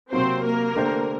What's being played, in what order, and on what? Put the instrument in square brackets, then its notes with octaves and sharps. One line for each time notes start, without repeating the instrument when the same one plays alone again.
[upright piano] C3 F#3 A#3 F#4 [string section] C4 C5
[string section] A#3 A#4
[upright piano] D3 A3 D4 G4 C5